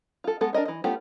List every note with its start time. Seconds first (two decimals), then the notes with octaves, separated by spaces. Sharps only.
0.24 F4 A4
0.41 G#3 B3 A4
0.53 D4 A#4 D#5 E5
0.65 E3 D#5
0.84 A3 B3 C#4 F4 G4